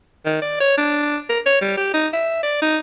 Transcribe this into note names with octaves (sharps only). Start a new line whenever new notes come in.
D#3
D5
C#5
D4
A#4
C#5
G3
G4
D#4
E5
D5
D#4